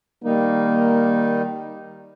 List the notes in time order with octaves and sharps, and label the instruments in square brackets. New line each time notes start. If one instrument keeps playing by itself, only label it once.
[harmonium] D#3 G3 D#4 [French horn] A#3